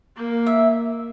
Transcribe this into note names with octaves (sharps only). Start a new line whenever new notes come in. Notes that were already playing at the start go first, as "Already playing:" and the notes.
A#3
E5